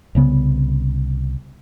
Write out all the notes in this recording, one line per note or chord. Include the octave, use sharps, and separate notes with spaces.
C2 C#3 B3